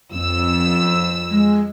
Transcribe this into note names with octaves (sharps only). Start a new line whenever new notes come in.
F2 E6
G#3